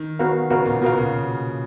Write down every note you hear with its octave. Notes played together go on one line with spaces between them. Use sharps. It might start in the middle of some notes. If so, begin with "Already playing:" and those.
Already playing: D#3
B3 F#4 A#4 F5
C#3 B3 F#4 A#4 F5
A#2
B2 B3 F#4 A#4 F5
C#3